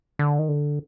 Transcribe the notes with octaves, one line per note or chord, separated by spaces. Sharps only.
D3
D#3
D3